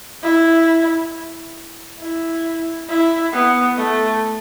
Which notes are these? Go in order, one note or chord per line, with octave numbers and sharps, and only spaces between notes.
E4
E4
E4
B3
A3